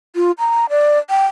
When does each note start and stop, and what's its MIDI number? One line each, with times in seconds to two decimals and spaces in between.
0.16 0.31 65
0.39 0.65 82
0.70 0.99 74
1.10 1.26 79